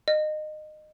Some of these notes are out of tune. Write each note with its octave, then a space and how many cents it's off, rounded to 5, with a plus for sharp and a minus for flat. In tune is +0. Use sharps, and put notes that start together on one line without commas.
D#5 -25